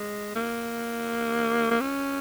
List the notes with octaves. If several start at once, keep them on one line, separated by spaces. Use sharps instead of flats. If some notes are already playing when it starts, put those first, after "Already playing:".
Already playing: G#3
A#3
A#3
C#4